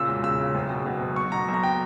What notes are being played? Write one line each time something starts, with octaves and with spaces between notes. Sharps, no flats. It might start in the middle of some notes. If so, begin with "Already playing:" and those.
Already playing: A#2 C#3 E6
E1
C#3 E6
C#3
F#1
B2
B2
F#1
B1 C#6
B2 A#5
B1
A#5
G5